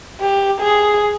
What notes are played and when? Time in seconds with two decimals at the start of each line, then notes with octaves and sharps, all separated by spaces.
0.21 G4
0.60 G#4